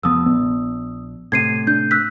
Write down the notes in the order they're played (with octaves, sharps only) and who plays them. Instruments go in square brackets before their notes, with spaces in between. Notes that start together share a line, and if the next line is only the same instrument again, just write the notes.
[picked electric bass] F1 F3 B3 [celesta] D#6 E6
[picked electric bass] A#1 [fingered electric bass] B3
[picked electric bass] A2 C3 [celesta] G#6 C7 D#7
[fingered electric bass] D4 [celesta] G6
[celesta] E6 F#6 B6